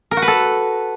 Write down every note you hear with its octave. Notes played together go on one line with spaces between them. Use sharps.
A#4
F#4
B4
A4